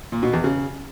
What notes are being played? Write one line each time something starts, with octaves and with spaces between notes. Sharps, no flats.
A#2
B2
E2
C#3